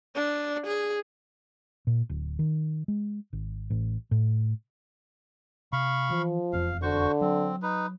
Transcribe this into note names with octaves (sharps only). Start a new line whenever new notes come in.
D4
G#4
A#2
D1
D#3
G#3
G#1
A1
A2
C3 F5 B5 C#6
E3 F3
E1 F2 F5
D3 F#4 C5 C#6
F#3 C4
D#4 B4